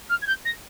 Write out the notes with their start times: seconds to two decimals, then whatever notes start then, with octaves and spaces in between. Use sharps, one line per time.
0.09 F6
0.21 G#6
0.26 G6
0.45 A#6